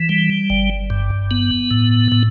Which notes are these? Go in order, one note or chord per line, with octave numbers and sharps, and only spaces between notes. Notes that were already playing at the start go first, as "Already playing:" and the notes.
Already playing: E3
G3
G1
G2
B3
A2
A2